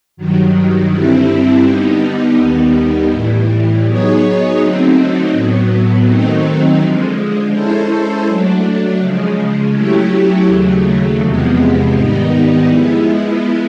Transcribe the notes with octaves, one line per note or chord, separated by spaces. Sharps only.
G2 D#3 F#3
G2 D3 G3 C4 E4
D3 G3 B3 D#4
D#2 D#3 G3 B3
A2 E3 G3
F#3 B3 D#4 G#4 C#5
D3 F#3 A3 C4 D#4
A2 F#3 B3
D#3 F#3 A3 C4 D#4
D3 F3 G#3
G#3 C#4 E4 A4 C5
F#3 A3 D4
C#3 F3 G#3
F#3 A3 C#4 E4 G4
D#2 C#3 F#3 A3
E2 C3 F3 G#3 B3
G#2 D#3 G3 B3 D#4
F3 G#3 B3 E4